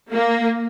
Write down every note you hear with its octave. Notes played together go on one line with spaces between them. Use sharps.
A#3